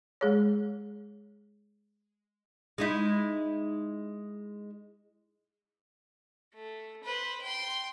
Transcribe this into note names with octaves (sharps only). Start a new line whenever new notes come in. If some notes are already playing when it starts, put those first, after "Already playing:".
G#3 G#4 C#5
G#3 D#4 E4
A3
B4 C5
G5 C6